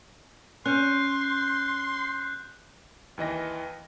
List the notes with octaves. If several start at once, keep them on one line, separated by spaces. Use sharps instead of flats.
C#4 C6 F#6 G6
D#2 E3 D#5 A#6